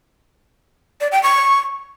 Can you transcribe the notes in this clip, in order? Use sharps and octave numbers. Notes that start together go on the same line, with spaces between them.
D5
G5
C#6